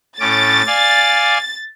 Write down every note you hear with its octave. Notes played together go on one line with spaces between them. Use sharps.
A2 C#4 D6 A6
D5 F5 G#5